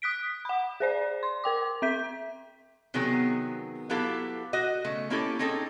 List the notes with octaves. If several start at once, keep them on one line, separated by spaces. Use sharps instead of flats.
D#6 F#6 B6 D7
F#5 B5
G#4 C5 D5
C6
A#4 G5 D6
C4 E5 G6 B6
C3 D#3 F#3 B3 G#4
F#3 B3 E4 G4 A4 F5
F#4 D#5
C#3 A3
A#3 C#4 E4 G4 A4
C4 C#4 D#4 G#4 A4